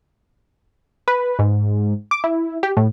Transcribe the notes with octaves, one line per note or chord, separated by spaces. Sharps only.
B4
G#2
D6
E4
G4
A2